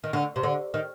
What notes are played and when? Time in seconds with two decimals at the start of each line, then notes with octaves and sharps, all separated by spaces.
0.04 D#3
0.13 D3
0.36 C3
0.43 D3
0.74 D#3